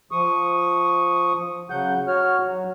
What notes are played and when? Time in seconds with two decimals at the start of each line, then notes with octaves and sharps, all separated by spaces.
0.11 F3 C#6 D#6
1.70 C#3 F#3 F#5 G6
2.07 F#4 C#5 F6
2.44 F#3